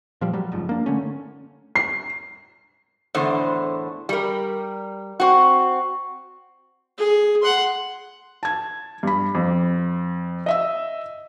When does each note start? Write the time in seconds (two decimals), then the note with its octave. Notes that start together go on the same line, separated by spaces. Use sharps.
0.21 A#2 F3 G3
0.33 F#3 G3
0.52 F#1 G#2 F3
0.69 A#3 D4
0.86 D3 A3 C#4
1.75 C7
3.15 E2 A2 D3 C5
4.09 G3 A#4
5.20 C4 F#4
6.98 G#4
7.42 F#5 C6
8.43 A5 G#6
9.03 G2 B5
9.35 F2
10.46 D#5 E5 E6